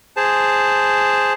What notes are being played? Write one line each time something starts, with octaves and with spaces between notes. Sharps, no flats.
G#4 C5 A5